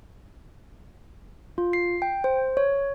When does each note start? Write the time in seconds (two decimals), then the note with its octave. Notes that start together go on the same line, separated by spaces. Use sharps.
1.58 F4
1.73 C7
2.02 G5
2.24 C5
2.57 C#5